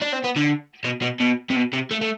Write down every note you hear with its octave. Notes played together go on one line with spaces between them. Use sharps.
D4
C4
B3
D3
B2
B2
B2
C3
B2
C3
A3
A3